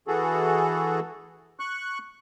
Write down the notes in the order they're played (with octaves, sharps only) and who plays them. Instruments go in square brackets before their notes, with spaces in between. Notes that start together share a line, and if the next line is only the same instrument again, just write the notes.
[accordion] E3 F#4 G#4 A4
C#6 F#6